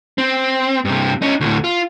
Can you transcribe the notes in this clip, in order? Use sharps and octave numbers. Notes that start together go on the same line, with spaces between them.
C4
G2 C3
C#4 D#4
D2 A2
F4